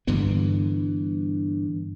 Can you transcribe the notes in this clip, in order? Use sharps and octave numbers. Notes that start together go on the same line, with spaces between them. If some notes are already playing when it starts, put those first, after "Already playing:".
G2 D3 E3 B3